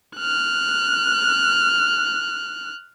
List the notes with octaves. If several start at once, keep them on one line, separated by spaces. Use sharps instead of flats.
F6 F#6